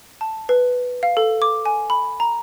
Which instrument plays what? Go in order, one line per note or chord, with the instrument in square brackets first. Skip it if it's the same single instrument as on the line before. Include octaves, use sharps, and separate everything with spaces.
[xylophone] A5
B4
F5
A4
D6
G#5
B5
A#5